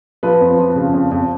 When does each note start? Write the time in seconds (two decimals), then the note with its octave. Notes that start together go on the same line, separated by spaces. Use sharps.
0.23 F3 B4
0.41 F2
0.58 F3
0.76 C#3
0.94 F2
1.11 F2